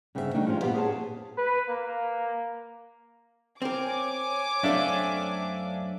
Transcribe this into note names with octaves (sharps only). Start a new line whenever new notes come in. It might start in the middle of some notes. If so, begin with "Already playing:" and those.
G2 C#3 B3 C4 G#4 E5
D#3 G3 A3 A#3 D4 D#4
F3 G3 G#3 C#4 F4
G2 A#2 B3 F4 G4 C5
G#4 C#5 F#5 G#5 A5
B4
A#3
C4 A#4 C#5 G#5 D6
F#2 A3 C4 D4 E5 F5